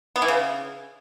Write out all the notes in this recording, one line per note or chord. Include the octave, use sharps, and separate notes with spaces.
B3
E3
C#3